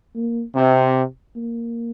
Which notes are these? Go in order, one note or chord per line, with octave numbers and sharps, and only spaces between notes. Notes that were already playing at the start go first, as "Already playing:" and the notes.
A#3
C3 C4
A#3